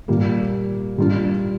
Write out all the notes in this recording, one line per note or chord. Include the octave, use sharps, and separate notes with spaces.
A#2 G3 A#3
A#2 G3 D4 F4